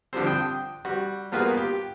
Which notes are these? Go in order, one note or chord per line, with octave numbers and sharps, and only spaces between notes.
D3 F3 G3 C4
G5 D#6
G3 F#4
G3 A#3 B3 F4 F#4 G#4
G4